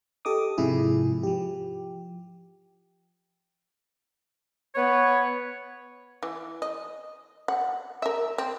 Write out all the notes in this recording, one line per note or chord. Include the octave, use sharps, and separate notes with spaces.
G4 A4 D#5 D6 D#6
G#2 C3 F3 E4 G#4
F3 G4
B3 B4 C#5
E3
D#5
F#5
A#4 E5
C4